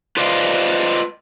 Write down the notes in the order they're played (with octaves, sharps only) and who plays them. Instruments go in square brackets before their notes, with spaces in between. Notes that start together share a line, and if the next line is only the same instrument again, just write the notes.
[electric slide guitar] F4 B4 C5 D5 D#5 F5